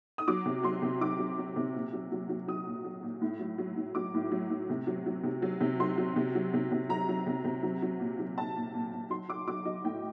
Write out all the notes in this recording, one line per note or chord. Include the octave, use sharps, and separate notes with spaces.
D#6
F#3 D6
C3
F#3 C6
C3
F#3 D6
F#3
F#3
C3
A#2
F#3
F#3
F#3
F#3 D#6
A#2
F#3
A#2
A2
F#3
F#3
A2
F#3 D6
A2
F#3
A2
C3
F#3
F#3
C3
F#3
C3
F#3 C6
F#3
C3
F#3
C3
C3
F#3 A#5
F#3
C3
C3
F#3
F#3
A#2
F#3
A#2 A5
A#2
A#2
A#2
F#3 C6
F#3 D6
F#3 D6
F#3 D#5
A2 G5